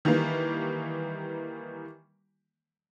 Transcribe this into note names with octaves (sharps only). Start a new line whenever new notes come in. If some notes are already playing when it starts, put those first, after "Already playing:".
D#3 E3 G3 A#3